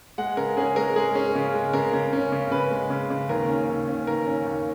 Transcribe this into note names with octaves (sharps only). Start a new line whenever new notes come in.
G#3 F#5
C#3 A#4
C#4 G#4
G#3 A#4
G#3 G#4
C#4
C#3
G#3
C#3 A#4
C#3
C#4
C#3
C#3 B4
G#3
C#3
C#3
D#2 A#4
C#4
D#2
C#4
D#3 A#4
C#4
D#2